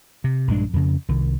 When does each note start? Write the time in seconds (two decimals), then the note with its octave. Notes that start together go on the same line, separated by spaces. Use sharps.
0.24 C3
0.48 A#1 G2 G#3 D4
0.73 F2 C#3
1.09 C2 D#3